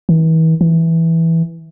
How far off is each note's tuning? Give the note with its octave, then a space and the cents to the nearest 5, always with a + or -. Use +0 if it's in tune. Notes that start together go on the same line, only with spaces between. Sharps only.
E3 -40
E3 -5